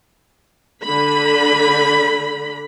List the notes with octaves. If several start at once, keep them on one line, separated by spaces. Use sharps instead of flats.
D3 B5